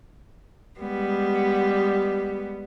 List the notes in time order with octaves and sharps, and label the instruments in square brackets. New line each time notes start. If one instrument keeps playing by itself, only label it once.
[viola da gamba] G3 G#3 B3